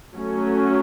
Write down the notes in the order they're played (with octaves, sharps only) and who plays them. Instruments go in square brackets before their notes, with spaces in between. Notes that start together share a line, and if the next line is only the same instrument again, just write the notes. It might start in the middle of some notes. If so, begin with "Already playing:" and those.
[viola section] F#3 A3 C#4